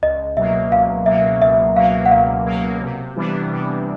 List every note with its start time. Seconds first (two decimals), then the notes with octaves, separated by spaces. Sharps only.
0.02 C#2 D#5
0.36 B2 F#3 A#3 E5
0.72 C#2 F5
1.06 B2 F#3 A#3 E5
1.42 C#2 E5
1.76 B2 F#3 A#3 F5
2.06 F#5
2.11 C#2 F5
2.46 B2 F#3 A#3
2.81 C3
3.16 E3 G3 B3 D4
3.51 C3